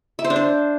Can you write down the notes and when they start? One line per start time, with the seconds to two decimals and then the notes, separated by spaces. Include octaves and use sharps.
0.19 E5
0.24 C5
0.30 D4
0.36 C5